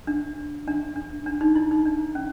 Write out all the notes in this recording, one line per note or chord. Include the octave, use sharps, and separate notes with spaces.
D4
D4
D4
D4
D#4
E4
D#4
D4
C#4